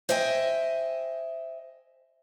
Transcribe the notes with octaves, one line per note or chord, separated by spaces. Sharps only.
C5 D#5 E5 G5 G#5